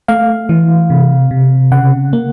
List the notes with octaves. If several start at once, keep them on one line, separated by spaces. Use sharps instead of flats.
A3 F5
E3
C3
C3
C#3 F#5
A#3